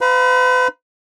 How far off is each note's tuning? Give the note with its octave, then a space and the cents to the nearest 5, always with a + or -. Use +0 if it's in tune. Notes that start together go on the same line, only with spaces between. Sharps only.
B4 +45 F5 +0 B5 -40